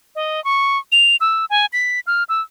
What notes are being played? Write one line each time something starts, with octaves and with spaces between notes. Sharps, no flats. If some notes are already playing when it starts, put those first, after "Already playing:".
D#5
C#6
F7
E6
G#5
B6
F6
E6